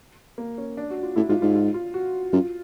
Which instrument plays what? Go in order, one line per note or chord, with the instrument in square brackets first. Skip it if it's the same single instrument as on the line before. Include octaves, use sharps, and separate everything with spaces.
[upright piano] A#3
C#4
D4
F#4
F4
[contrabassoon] A2 [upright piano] E4
[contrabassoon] G#2 [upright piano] F4
[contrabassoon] G#2 [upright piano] F4
[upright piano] F4
F4
F#4
[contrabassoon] F#2 [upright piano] F4